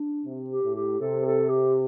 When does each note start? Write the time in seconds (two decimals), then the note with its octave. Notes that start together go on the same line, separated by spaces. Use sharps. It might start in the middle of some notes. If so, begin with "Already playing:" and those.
Already playing: D4
0.25 C3
0.50 G4
0.63 A2
0.75 G4
1.00 C3 A4
1.25 A4
1.49 G4